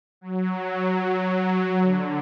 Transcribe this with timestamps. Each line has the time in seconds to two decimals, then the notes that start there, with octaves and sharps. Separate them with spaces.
0.21 F#3
1.80 D3